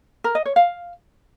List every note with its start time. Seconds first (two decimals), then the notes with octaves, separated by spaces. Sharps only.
0.24 A#4
0.35 D#5
0.45 C#5
0.56 F5